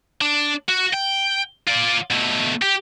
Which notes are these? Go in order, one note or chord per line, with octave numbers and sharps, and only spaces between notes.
D4
F#4
G5
F4 D5
B2 A3
G4